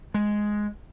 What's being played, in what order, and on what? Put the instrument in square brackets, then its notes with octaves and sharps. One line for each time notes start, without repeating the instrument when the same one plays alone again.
[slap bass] G#3